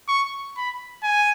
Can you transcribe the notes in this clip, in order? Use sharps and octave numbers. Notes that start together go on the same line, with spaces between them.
C#6
B5
G#5